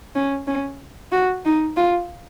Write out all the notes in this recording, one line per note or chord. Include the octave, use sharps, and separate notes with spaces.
C#4
C#4
F#4
D#4
F4